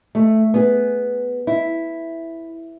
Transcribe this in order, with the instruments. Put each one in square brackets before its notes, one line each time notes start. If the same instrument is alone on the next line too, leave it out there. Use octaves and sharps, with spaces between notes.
[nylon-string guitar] A3
B3 G#4
E4